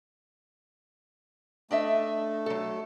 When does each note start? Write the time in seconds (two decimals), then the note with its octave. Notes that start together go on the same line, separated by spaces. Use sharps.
1.71 A3 D4 D#5 E5
2.46 F#3 A4